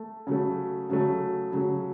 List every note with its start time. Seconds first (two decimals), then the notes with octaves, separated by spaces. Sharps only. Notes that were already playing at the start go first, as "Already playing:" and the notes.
Already playing: A3
0.27 C#3 F#3 A3
0.90 C#3 F#3 A3
1.52 C#3 F#3 A3